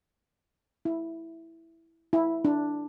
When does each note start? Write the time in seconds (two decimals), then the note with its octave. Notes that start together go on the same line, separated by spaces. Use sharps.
0.85 E4
2.13 E4
2.45 D4